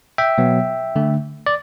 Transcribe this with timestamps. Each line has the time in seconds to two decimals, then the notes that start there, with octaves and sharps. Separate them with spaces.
0.18 E5 G5
0.38 B2 F#3 B3
0.96 D3 A3
1.46 D5